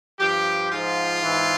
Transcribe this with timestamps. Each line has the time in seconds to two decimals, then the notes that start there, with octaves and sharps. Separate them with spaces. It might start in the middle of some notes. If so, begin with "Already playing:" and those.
0.20 G2 F3 G4
0.71 G#2 F3 F4
1.23 G#2 E3